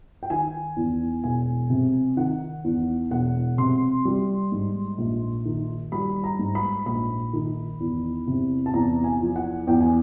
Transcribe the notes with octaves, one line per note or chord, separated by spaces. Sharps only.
G5
D#3 G#5
E2
E1 G#5
C3
D#3 F#5
E2
E1 F#5
C3 C6
G3
G#2
A#1
D#3
G3 B5
A#5
G#2
B5
A#1 B5
D#3
E2
C3
A5
E2 A#5
G#5
F3
F#5
E2 G5
G#5